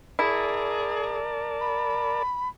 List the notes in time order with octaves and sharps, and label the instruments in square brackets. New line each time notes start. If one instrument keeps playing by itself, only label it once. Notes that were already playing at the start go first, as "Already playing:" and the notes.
[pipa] E4 [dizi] G#4 [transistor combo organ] A#4 D5 A5
[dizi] B5